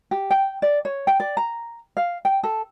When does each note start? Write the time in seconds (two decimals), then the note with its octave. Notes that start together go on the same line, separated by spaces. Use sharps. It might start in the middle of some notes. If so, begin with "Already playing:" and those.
0.11 G4
0.31 G5
0.62 D5
0.85 C#5
1.07 G5
1.20 D5
1.37 A#5
1.97 F5
2.25 G5
2.43 A4